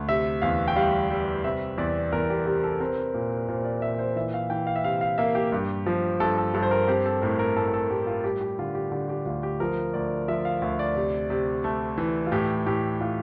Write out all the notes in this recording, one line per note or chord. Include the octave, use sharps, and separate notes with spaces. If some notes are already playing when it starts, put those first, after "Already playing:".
Already playing: D2
C3 E5
E2 F5
G5
G3 F5
G3
C3 E5
E2 D5
E2 A#4
G4
C3 G4
A4
C4 A#4
A#2
A#2 C5
D5
A#2 E5
C5
E3 E5
F5
E3 G5
F5
E5
C3 F5
F5
A#3 E5
G4
G2
F3
G2 A4
A4
G2 A4
C5
A#4
C4 G4
A4
A2 A#4
A#4
A2 A4
A#4
A4
A2 G4
F4
G3 G4
G4
D3 F4
G4
D3 G4
G4
D2 F4
G4
F3 A#4
D2 D5
F3 E5
F5
D2 E5
D5
C3
C3
A3
E3
F4
A2 G4
A2 G4
A2 F4